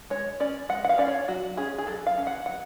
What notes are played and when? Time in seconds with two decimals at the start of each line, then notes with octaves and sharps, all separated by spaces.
0.10 G#3 C#5
0.40 C#4 D5
0.69 G#3 F#5
0.85 F#5
0.89 F5
0.98 C#4 D5
1.08 C#5
1.28 F#3 F#4
1.57 C#4 G#4
1.78 G#4
1.87 F#3 A4
2.07 F5
2.18 C#4
2.27 F#5
2.46 F#3 F#5